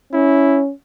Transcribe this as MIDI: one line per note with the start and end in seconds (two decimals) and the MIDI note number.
0.13 0.72 61
0.13 0.61 64